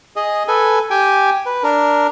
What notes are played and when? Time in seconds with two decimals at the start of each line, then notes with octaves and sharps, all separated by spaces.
0.16 G#4 D#5
0.48 A4 B4 G#5
0.90 G4 G5 G#5
1.46 B4
1.64 D4 A#4